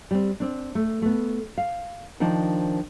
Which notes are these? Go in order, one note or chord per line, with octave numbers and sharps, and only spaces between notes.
G3 C4
C4 D4
A3
A3 B3
F5
D#3 F3 D4 D#4 C5